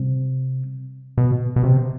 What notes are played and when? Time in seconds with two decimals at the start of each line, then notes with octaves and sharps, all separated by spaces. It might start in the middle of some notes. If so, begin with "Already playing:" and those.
Already playing: C3 G3
1.18 B2
1.56 B2
1.64 C3